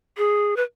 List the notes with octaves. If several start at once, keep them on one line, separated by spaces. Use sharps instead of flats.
G#4
B4